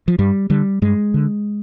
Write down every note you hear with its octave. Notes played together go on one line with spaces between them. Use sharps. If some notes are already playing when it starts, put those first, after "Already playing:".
F3
G2 G3
D3 G3
G2 G#3
D3